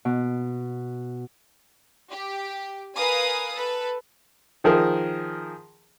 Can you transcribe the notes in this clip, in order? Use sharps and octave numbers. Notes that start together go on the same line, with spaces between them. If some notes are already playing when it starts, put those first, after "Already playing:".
B2
G4
A#4 B4 F5 G#5 D#6
A4 B4
D#3 F3 G#4 A#4